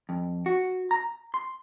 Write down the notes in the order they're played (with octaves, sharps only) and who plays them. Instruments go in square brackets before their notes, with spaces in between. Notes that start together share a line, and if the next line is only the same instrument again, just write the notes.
[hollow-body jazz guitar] F2
F#4
A#5
C6